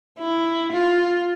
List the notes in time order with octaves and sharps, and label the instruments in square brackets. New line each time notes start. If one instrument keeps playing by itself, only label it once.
[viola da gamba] E4
F4